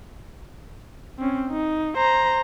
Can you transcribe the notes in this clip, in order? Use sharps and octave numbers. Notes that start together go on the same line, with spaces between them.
C4 C#4
D#4
C5 A#5